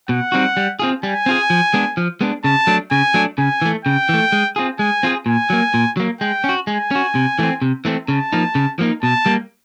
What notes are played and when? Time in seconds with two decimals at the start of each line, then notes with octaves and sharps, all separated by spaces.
0.09 B2 F#5
0.32 G3 C4 D#4 F#4
0.57 G3
0.79 C4 F4 G#4
1.03 G3 G#5
1.26 C4 F4 G#4
1.50 F3
1.74 G#3 B3 D4
1.97 F3
2.21 G#3 B3 D4
2.44 C#3 A5
2.67 F#3 A3 D4
2.91 C#3 G#5
3.14 F#3 A3 D4
3.38 C#3 G#5
3.62 E3 A3
3.85 C#3 G5
4.09 E3 A3
4.32 G#3
4.56 C4 F4 G#4
4.79 G#3 G#5
5.03 C4 F4 G#4
5.26 A#2 G#5
5.50 F#3 A#3
5.74 A#2
5.97 F#3 A#3
6.21 G#3 G5
6.44 C#4
6.49 F#4
6.67 G#3 G#5
6.91 C#4 F#4
7.15 C3
7.39 E3 A3 C4
7.62 C3
7.85 E3 A3 C4
8.08 C#3 A5
8.33 F3 A#3 D#4
8.55 C#3
8.79 F3 A#3 D#4
9.02 B2 A5
9.26 G3 A#3